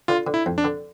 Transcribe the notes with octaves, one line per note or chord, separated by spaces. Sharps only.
D3 F4
D3
E4
F2
D4
D3